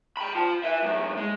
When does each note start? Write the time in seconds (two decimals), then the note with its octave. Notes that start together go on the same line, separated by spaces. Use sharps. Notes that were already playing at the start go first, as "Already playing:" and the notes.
0.17 G5 B5
0.35 F4 A5
0.64 B4 E5
0.83 F#2 A2
1.17 G#3